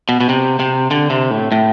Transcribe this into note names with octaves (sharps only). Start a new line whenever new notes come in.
B2
B2
C3
C3
D3
C3
A2
A2